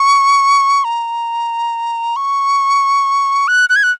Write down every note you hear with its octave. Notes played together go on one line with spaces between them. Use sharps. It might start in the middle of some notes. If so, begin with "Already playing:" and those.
Already playing: C#6
A#5
C#6
F#6
F#6
G#6
F#6